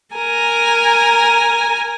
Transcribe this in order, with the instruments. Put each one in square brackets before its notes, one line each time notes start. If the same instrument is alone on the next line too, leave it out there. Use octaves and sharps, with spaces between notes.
[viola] A#4 G#5